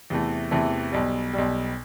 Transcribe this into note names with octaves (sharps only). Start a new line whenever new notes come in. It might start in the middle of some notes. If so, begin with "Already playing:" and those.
E2 C3 E3 A3
E2 C3 E3 A3
B1 B2 G3
B1 B2 G3